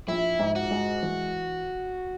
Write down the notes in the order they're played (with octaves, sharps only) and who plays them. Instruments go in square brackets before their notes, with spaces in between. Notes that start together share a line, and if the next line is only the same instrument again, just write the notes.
[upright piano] A#1 [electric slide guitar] E4
[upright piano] G#2
[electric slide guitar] F#4
[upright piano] G#3
E3